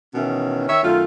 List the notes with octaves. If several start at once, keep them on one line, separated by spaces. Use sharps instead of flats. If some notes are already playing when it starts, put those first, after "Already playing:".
B2 D#3 E3 C#4
D#3 C#5 E5
F#2 D#3 A3 F4